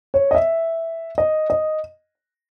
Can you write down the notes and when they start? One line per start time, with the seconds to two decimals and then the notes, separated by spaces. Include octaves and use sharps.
0.14 C#5
0.31 D#5
0.35 E5
1.18 D#5
1.50 D#5